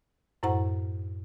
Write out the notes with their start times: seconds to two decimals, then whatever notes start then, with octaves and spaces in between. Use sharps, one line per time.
0.43 F#2 A2 E4 C5 F#5 A#5